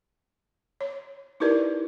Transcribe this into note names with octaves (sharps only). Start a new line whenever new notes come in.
C#5
D#4 E4 G4 A#4 B4 D5